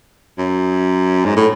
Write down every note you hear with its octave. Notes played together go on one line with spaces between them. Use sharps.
F#2
G#2
A2